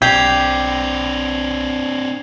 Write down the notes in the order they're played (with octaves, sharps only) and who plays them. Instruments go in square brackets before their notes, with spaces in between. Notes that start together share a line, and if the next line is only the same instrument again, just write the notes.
[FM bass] B1 [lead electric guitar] C4 D4 [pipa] G4 [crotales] G#6 C7 F7